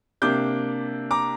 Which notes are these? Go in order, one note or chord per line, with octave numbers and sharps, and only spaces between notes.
C3 A#3 D4 D6 G6
A#5 D6